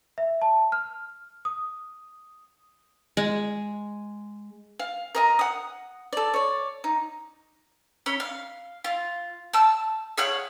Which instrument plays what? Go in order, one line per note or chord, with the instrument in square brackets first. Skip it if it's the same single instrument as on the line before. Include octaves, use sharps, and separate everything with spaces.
[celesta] E5
A5
F6
D#6
[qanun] G#3
[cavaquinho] F5
A#4 D#5 A#5
F#5 D#6
A4 D5
C#5 D5
D#4
[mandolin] C#4 C#5 B5
F5
F4
A5 E6
G#4 C#5 F5 F#5